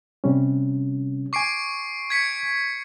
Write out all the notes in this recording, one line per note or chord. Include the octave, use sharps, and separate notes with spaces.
C3 G3 C#4
G#5 C#6 D6 C7 D7
G#6 B6 C#7